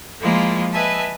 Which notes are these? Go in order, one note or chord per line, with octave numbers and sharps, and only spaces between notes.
F3 G#3 A#3 E4 F4
B4 D#5 E5 G#5 A5